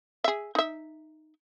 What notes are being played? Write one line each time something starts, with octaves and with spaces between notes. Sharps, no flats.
G#4 E5
D#4 E5